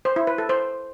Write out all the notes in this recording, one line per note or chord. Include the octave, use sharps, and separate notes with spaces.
C5
E4
B4
A4
C5